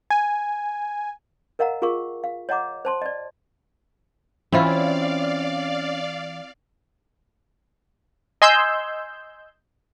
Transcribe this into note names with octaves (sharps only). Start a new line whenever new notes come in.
G#5
A#4 D#5 F5 F#5 A#5
F4 G#4 A#4 F5 C#6
F5
C#5 D#5 F#5 A#5 D6
C5 A5 C6
D5 D#5
E3 C4 C#4 E4 F4 D5 F5
D#5 G#5 C6 E6 G6